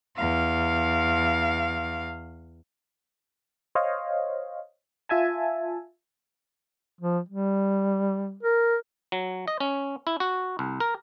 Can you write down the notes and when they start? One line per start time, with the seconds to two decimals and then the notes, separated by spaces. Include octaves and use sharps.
0.16 E2 F5
3.75 C5 C#5 D#5 F5
5.09 F4 E5 G#5 A5
7.01 F3
7.29 G3
8.43 A#4
9.12 F#3
9.48 D#5
9.60 C#4
10.07 E4
10.20 F#4
10.59 C2
10.80 A#4